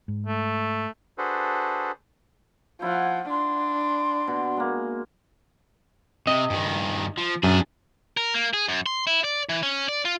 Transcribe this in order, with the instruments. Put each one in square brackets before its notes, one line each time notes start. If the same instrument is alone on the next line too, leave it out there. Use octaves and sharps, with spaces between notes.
[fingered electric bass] G#2
[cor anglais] A3
[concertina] D4 F#4 G#4 A4 B4 C5
[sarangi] F3 [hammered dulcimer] E4 F#5
[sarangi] D4 [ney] C6
[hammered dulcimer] B2
G#3 A#3
[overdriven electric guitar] C3 [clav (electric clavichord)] D#5
[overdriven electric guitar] G2 D#3
F3
[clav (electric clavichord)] F#2 [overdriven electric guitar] D4 G#4
[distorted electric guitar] A#4
A#3
G#4
F#2
C6
E4
D5
E3
C#4
D5
F4